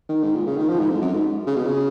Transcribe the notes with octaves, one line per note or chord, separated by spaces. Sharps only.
D#3
G#2
A#2
C#3
D#3
F3
G#2
F2
F#2
G#2
C#3
B2
C#3